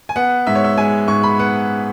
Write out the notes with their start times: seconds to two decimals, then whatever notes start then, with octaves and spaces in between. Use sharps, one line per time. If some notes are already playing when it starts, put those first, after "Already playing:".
0.09 G#5
0.16 B3 F#5
0.47 G#2 E5
0.55 C#5
0.64 E5
0.78 G#3 G#5
1.08 G#2 C#6
1.23 B5
1.39 B3 F#5